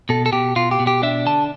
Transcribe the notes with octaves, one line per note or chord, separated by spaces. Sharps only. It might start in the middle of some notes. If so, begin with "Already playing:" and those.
B2 A4
A4
B2 G4
B2 F4
G4
B2
G4
D4 E5
D3 A5